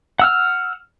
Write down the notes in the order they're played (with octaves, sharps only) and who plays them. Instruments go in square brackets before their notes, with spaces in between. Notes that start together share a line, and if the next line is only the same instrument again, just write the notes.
[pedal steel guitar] F#5 E6 F6